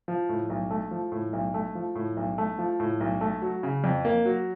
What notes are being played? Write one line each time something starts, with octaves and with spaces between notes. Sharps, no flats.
F3
A2
B1
A3
F3
A2
B1
A3
F3
A2
B1
A3
F3
A2
B1
A3
F#3
C#3
F2
A#3
F#3